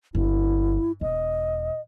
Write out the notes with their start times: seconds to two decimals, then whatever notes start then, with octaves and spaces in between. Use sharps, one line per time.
0.15 G1 E4
1.01 E1 D#5